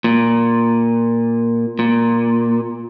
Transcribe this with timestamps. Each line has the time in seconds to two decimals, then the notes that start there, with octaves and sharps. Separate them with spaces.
0.04 A#2
1.79 A#2